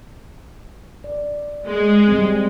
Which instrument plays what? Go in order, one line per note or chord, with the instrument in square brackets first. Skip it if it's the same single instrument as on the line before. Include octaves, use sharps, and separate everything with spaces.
[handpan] D5
[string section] G#3
[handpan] G3 C4